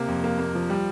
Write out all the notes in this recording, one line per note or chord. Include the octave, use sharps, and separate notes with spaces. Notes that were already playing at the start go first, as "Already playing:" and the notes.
Already playing: C3 A#3
F2
A#3
A#3
F3
G3